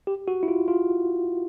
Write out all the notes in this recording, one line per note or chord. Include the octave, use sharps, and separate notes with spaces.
G4
F#4
E4
F4
F4